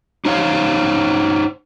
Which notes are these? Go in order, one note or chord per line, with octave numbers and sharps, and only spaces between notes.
D#4 C5 C#5 F5